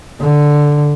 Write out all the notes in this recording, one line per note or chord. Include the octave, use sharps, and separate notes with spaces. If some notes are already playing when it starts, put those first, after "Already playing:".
D3